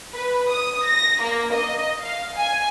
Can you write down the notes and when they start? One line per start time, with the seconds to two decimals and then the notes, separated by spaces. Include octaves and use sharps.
0.13 B4
0.51 D#6
0.86 A#6
1.22 A#3
1.54 D#5
2.02 F5
2.37 G#5